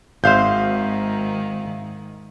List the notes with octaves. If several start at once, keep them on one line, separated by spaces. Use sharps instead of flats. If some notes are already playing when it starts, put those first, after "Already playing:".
G#1 G#2 D#3 C5 E5 F5 G6